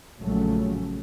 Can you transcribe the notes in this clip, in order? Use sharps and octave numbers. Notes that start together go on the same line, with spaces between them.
A#1 C#3 F#3 A3